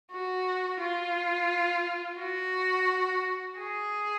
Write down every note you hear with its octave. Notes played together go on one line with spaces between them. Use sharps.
F#4
F4
F#4
G#4